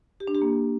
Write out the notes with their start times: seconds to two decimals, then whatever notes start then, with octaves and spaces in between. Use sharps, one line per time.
0.20 G4
0.27 D4
0.35 G4
0.42 A#3